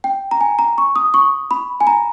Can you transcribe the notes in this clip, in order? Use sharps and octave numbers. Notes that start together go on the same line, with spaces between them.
G5
A#5
G#5
A#5
C#6
D#6
C#6
B5
G#5
A#5